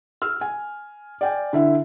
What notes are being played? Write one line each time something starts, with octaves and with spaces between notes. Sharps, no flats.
E6 F6
G#5
D5 G5 G#5
D3 E4 E5